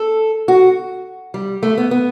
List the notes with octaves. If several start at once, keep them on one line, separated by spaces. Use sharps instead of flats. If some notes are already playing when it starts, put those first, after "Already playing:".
Already playing: A4
F#4
G3
A3
B3
B3